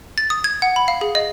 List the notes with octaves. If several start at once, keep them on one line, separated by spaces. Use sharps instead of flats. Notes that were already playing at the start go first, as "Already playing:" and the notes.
A6
D#6
G#6
F#5
B5
F5
G#4
D#5